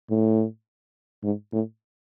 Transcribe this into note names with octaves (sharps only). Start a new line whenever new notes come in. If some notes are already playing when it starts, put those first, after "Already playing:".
A2
G#2
A2